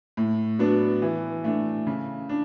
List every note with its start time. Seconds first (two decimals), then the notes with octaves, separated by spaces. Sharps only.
0.17 A2
0.59 F#3 B3 D4
1.02 E3
1.44 A3 D4
1.87 C#3
2.29 D4